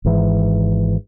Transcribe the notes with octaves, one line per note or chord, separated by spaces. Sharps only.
G#1 G#2 E3